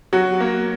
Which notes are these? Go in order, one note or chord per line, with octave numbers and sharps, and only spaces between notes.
F#3 F#4
A#3